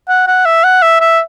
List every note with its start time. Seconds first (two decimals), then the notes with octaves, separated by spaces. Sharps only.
0.09 F#5
0.27 F#5
0.45 E5
0.64 F#5
0.82 E5
1.01 E5